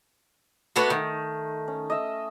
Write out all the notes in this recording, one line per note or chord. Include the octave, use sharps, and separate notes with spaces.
A3 B3 D4 F#4
D#3
C#4
D#5 E5